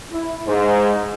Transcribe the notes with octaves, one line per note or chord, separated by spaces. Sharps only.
E4
G#2